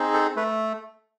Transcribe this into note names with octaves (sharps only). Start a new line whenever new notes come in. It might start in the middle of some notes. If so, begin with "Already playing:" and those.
Already playing: C4 D#4 G#4
A4
A3 B4